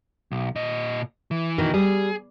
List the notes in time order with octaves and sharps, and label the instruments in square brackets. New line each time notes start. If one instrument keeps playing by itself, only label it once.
[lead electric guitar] B1
A#2 D#5
E3
[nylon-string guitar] B2 D#3
[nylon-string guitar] G3 [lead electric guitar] G#4